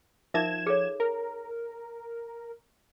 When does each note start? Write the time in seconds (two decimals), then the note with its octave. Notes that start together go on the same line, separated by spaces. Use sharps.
0.34 F3 D#4 A#4 E5 G#6 E7
0.66 G#4 A4 C#5
1.00 A#4